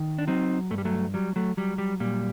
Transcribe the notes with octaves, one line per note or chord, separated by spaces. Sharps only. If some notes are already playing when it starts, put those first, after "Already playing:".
Already playing: D#3
D4
F#3 C4 D#4
G2 A3
G3
F#3 A3
F#3 G3
F#3 A3
F#3 G3
G3
A#2 G3